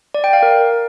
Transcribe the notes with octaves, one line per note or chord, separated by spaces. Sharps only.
D5
G5
F5
A#4